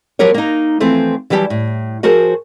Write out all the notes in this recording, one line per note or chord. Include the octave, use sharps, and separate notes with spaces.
F3 F#3 B3 G4 A#4 C#5
A#3 D#4
E3 F3 A3 C4 E4
E3 F#3 G3 G4 A5
A2
F3 F#4 G#4 A#4 C5